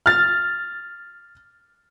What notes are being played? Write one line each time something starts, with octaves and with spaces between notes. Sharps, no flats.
F6 A6